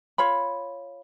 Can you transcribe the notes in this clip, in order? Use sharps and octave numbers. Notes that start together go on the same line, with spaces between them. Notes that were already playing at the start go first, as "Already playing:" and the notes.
F4 C#5 B5